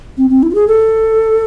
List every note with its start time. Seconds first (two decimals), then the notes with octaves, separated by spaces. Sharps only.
0.18 C4
0.30 C4
0.43 E4
0.50 F4
0.55 G#4
0.67 A4